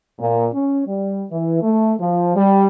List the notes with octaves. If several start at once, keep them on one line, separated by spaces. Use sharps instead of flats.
A#2
C#4
G3
E3
A3
F3
G3